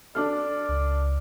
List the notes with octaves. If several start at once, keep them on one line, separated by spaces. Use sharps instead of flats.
D4 A4 D5 D6 F6
C#2